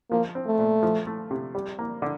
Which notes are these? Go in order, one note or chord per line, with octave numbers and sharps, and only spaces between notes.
F3 A#3
C4
A3
A#2
F3
A3
C3
G3
A#3
D3